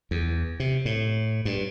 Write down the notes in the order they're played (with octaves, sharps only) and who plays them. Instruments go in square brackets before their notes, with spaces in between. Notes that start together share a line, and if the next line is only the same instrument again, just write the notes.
[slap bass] E2
C3
A2
G2